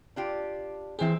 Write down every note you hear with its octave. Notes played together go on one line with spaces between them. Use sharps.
D4 F4 G4
A#2 E3 C4 G#4 E5